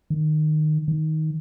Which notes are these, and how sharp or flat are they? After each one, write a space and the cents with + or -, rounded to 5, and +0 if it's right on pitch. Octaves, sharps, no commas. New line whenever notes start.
D#3 -20
D#3 +10